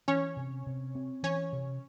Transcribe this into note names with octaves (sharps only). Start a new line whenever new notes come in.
E3 C#4 C#5
C3
C3
C4
E3 C#4 C#5
C3